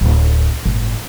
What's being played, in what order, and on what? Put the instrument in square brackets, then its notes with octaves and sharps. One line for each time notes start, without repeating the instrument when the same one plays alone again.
[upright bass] D1
G1 A2